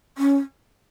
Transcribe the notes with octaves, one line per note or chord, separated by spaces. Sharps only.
C#4